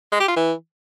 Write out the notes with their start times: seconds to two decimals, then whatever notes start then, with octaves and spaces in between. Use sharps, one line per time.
0.12 G#3
0.20 G4
0.28 F4
0.36 E3